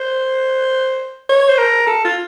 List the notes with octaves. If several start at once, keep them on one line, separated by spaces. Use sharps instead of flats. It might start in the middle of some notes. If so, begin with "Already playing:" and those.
Already playing: C5
C#5
C5
A#4
A4
F4